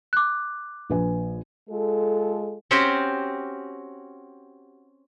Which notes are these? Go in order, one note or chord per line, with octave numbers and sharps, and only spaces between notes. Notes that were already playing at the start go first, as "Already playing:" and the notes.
D6 F#6
A#1 B4 G#5
G#3 F4 A4
C4 C#4 F#4 G4 C5